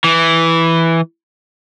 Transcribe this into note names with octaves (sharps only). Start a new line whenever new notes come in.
E3